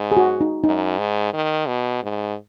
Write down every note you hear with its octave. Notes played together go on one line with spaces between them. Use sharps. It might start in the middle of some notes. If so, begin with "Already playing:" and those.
Already playing: G#2
G#4
F#4
D#4
F#2 D#4
G#2
D#3
B2
G#2